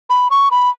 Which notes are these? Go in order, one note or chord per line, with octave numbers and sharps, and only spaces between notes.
B5
C#6
B5